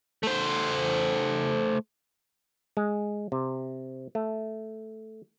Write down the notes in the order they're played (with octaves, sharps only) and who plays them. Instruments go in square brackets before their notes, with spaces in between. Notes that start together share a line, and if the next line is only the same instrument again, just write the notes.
[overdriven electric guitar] A3 C5
[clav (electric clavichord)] G#3
C3
A3